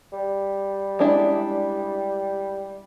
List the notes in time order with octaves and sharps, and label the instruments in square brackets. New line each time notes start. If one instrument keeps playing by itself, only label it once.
[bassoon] G3
[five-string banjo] G#3 D4 E4